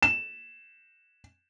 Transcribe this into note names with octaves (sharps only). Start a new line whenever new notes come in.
E7